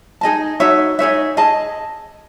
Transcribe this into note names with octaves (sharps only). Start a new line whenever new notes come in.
D#4 G#4 D#5 A5
D#4 F#4 C#5 E5
D#4 G#4 C#5 E5
G#4 D#5 A5